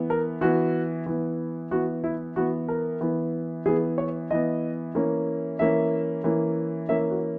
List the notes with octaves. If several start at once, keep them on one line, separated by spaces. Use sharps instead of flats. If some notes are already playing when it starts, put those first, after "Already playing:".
Already playing: E3 B3
A#4
E3 B3 F#4
E3 B3
E3 B3 F#4
E4
E3 B3 F#4
A#4
E3 B3
E3 B3 G#4
C#5
E3 B3 D#5
E3 A#3 C#4
E3 A#3 C#4 E5
E3 A#3 C#4
E3 A#3 C#4 E5
F#4